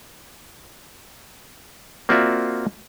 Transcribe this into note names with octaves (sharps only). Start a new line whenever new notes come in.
A#3 C4 F4 F#4 D5 E5